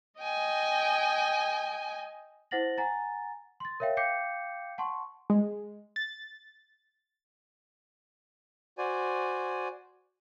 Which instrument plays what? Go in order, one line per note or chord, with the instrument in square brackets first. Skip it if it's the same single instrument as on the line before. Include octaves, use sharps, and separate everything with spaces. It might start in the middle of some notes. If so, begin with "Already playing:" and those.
[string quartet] D#5 G5 G#5
[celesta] E4 C5 F#5 A6 A#6 F#7
F#5 G#5 A#5 A6
C6 A6
A#4 C#5 E5 F5 G5
F5 G5 D6 G6 C7 C#7
F#5 A5 C6 C#6
[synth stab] G#3
A6
[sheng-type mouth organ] F#4 C5 D5 G#5